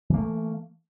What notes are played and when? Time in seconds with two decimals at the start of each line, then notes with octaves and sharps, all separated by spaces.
0.10 E3
0.14 A#3
0.18 A3